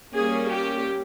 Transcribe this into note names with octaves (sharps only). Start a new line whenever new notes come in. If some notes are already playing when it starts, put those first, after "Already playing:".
G3 A#3 C#4 G#4
G4